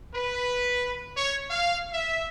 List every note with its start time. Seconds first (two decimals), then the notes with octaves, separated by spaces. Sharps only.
0.14 B4
1.16 C#5
1.50 F5
1.92 E5